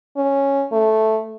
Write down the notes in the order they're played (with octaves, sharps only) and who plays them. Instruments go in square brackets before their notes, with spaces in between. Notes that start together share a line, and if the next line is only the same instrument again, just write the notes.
[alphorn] C#4
A3